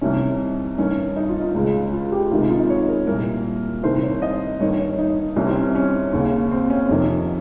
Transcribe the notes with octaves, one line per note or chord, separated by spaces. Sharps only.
C2 C3 D#3 C#4
G2 D#3 C#4
D#4
F4
D#4
C#2 C#3
F4
G4
C#2 C3 D#3 F4
D#4
F4
D#4
C#5
A#4
C2 A#2 A#4
C2 C3 D#3 C5
C#5
D#5
G2 D#3 C#5
C#5
D#4
C2 C3 D#3 C#4
C4
C#4
C#4
D#2 C#3
C4
C#4
F2 C3 D#3